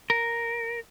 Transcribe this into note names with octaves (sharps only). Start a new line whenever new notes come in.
A#4